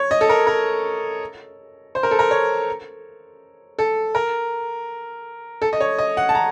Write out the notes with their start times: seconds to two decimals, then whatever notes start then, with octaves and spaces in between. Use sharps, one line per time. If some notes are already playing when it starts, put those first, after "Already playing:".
Already playing: C#5
0.11 D#5
0.21 A4
0.29 A#4
0.47 A#4
1.95 C5
2.03 A#4
2.11 A4
2.19 A#4
2.31 C#5
3.79 A4
4.15 A#4
5.62 A4
5.73 D#5
5.81 C#5
5.98 D#5
6.17 F#5
6.29 A5
6.35 A#5